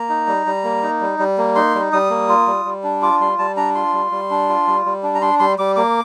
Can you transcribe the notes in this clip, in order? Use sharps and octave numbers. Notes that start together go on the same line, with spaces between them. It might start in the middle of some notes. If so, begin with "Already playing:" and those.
Already playing: A#3 A#5
D#4
G3
G3
A#3
D#4
G3
G3
A#3
D#4 C6
G3
G3 D#6
A#3
F4
G3
G3
D4
F4 D6
G3 C6
G3 A5
D4 A#5
F4 C6
G3
G3
D4
F4
G3
G3
D4
A#5
D4 C6
G3 C6
G3 D6
A#3 D6